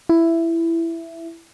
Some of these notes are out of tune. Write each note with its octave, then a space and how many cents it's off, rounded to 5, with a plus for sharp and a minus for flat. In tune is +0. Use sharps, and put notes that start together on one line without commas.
E4 +10